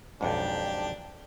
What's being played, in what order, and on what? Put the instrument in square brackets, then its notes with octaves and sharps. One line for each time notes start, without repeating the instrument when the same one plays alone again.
[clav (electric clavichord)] B1 F2 G#2 [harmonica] D4 G4